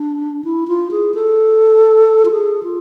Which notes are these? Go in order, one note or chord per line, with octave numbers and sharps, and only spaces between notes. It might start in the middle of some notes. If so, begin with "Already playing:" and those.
Already playing: D4
E4
F4
G#4
A4
F4
G#4
F4